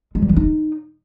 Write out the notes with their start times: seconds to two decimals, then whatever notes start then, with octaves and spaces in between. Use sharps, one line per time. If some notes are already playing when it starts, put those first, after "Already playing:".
0.15 G#3
0.22 G3
0.29 E3
0.36 D#4